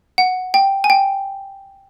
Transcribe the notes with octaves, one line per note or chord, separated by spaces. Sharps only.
F#5
G5
G#5
G5